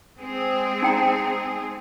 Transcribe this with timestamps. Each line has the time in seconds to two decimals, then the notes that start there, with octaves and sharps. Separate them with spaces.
0.20 G#3 C4 G#4
0.82 D#4 G5 A#5